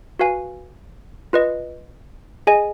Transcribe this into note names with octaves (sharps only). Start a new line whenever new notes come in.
F#4 B4 F5 G#5
F4 B4 D#5
G#4 D#5 G#5